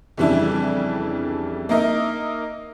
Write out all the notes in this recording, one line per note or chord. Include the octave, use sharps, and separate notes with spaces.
F2 C#3 E3 G3 D4 E4
A#3 D#4 A#4 D#5 E5